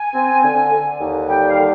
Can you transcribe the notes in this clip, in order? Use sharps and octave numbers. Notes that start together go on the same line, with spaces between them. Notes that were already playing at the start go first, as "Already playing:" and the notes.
Already playing: G#5
C4
D3
D3
D#2
G3 G5
F5
D3